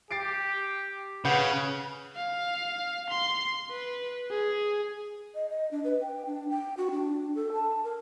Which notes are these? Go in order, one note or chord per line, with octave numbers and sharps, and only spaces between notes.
G4 A6 C7 D7
C#3 B4 F#5 G6
F5
C6
B4
G#4
D#5
D#5
D4
B4
G5
D4
G5
F#4
D4
A4
A5
A#4